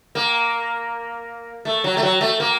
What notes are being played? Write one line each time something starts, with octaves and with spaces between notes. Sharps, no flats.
A#3
A3
F#3
A3
F#3
A3
A#3